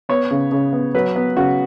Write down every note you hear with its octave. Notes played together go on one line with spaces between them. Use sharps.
B3 C#5
C#3
C#3
B3
F#3 B4
B3
C#3 F#4